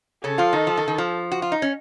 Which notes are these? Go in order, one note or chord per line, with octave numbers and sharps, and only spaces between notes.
C#3 C#4 A4
F3 F4
D#3 D#4
F3
D#3
D#3
F3
F#4
F4
D#4
C#4